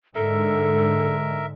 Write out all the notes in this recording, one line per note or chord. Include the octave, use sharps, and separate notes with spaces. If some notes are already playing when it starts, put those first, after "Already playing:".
G#2 D3 G#3 A4 A#4 E5